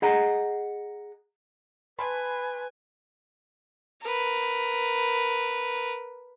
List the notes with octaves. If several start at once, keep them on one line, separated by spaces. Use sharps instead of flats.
G#4 D#5 F#5 A#5
B4 G#5 A5 B5 C6
A#4 B4